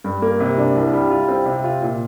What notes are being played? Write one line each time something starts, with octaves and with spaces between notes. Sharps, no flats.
G2
A#3
C3
D4
C2
G3
F4
C4
C3
F4
A#2